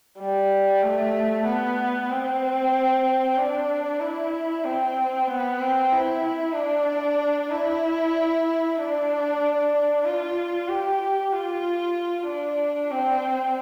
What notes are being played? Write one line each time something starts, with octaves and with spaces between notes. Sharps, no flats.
G3
A3
B3
C4
D4
E4
C4
B3
C4
E4
D4
E4
D4
F4
G4
F4
D4
C4